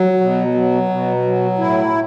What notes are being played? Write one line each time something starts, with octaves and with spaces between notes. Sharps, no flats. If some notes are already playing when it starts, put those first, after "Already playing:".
Already playing: F#3
B2
F#3
B2
F#3
A2 E4